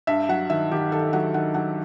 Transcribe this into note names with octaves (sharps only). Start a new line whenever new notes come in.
G2 E5
F#3 F#5
D#3 E5
D#3 G4
D#3 A4
F#3 F#5
D#3 F#5
F#3 F#5